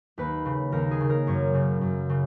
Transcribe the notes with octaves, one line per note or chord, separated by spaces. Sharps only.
D#2 B4
C#3
D#2 A#4
G#4
C#3
A#4
F#2 C#5
C#3
F#2
C#3